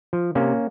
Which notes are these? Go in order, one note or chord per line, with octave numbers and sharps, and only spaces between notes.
F3
C3 A#3 C#4